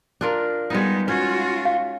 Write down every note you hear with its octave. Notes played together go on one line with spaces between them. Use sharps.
D4 F4 A#4
G3 G#3 B3 D#4
C#4 F4 F#4
F5